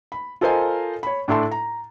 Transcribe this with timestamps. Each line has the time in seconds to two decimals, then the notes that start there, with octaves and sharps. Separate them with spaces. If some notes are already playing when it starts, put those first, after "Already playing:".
0.12 B5
0.41 F4 A4 A#4 C5 D#5 G#5
1.03 C#5 B5
1.28 A2 D4 E4 A4 A5 C6
1.51 A#5